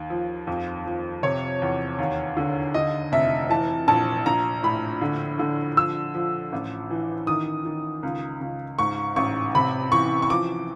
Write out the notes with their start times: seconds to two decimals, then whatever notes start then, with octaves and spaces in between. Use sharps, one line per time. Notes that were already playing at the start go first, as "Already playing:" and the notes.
Already playing: D#2
0.10 F3
0.47 F2
0.86 F3
1.23 C3 C#5
1.62 E2
1.98 D#2
2.37 D3
2.74 D3 D#5
3.12 F1 E5
3.49 E3 A5
3.88 A#1 A5
4.26 A#1 A#5
4.63 A2 B5
5.01 D3
5.39 D3
5.77 F3 E6
6.15 F3
6.52 A1
6.90 E3
7.27 D#3 D#6
7.65 D#3
8.03 C#2
8.41 C#2
8.79 G#2 C#6
9.16 A1 C#6
9.55 C3 B5
9.92 E3 C#6
10.22 C#6
10.29 F3 D6